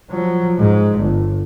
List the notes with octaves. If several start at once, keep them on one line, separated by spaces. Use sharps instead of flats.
F3 F#3
G#2
G1